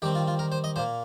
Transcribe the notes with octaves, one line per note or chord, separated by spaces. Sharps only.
D#3 G3 C4 G4
F4
F4
A#4
C5
D#5
A#2 A#3 C5